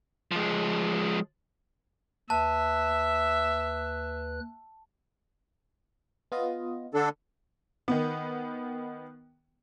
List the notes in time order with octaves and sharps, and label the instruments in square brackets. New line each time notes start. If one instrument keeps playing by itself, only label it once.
[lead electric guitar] F3 G#3
[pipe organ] D#2 B4 F#6 [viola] E5 [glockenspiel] A5
[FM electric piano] B3 F4 D#5
[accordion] D3 D4 A4
[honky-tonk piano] D#3 B3